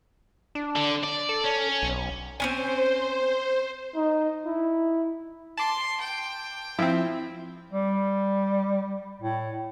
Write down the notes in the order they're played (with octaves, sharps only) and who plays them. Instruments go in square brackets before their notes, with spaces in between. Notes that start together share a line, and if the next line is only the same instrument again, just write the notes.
[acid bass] D4
[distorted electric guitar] D3
D5
[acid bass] A4
[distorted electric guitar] C#4
[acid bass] B1
[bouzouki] C4 C#4 G#5 [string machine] C5
[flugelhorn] D#4
E4
[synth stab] A5 D6 [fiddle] C6
[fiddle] G5
[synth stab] F3 C4 [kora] E4
[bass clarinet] G3
A2